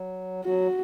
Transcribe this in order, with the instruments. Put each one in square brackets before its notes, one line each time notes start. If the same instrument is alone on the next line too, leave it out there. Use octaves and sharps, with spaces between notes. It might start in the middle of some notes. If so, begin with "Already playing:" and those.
Already playing: [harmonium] F#3
[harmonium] F#3 [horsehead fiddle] F#4